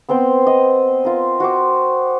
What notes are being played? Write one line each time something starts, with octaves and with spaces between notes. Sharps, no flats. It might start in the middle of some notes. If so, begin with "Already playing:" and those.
B3 C4 C5 G5
D#5
F4 A#4
F#4 C5 D6